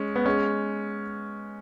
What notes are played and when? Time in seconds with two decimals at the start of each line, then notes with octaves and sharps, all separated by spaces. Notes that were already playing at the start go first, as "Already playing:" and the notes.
Already playing: G#3 C#4
0.16 B3
0.26 G#3 C#4